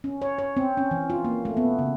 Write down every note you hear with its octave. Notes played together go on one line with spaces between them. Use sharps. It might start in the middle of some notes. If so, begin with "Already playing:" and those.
C#4
C#5
C#5
C4
C#4
E3
F4
A#3
A3
B3
C#3